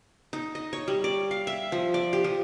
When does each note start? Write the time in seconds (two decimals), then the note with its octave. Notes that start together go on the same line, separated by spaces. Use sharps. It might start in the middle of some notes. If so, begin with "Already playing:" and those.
0.33 D#4
0.55 D#5
0.73 C#5
0.88 G3
1.04 D5
1.31 F5
1.47 E5
1.72 F3
1.94 D5
2.13 G4
2.24 F3